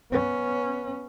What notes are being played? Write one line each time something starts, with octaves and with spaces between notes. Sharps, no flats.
B3 C#4